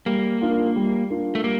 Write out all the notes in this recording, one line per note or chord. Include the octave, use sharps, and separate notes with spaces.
G3 A#3
D4 F4 A#4
G3
D4 F4 A#4
A3
G3 A#3